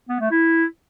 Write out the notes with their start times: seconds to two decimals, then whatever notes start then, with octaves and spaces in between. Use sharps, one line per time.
0.09 B3
0.20 A3
0.31 E4